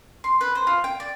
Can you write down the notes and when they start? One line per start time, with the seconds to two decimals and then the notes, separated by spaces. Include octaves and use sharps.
0.24 C6
0.41 B4
0.55 C5
0.67 F4
0.84 G5
1.00 D5